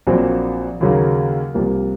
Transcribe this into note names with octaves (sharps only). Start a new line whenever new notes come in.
A#1 A#2 F#3 C4
D#2 C#3 F#3 A#3
C2 C3 F3 A#3